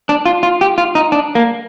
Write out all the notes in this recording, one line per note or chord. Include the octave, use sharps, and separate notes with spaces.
D4
F4
F4
G4
F4
D#4
D4
A#3